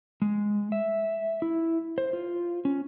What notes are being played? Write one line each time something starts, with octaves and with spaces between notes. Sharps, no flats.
G#3
E5
E4
C5
F4
C#4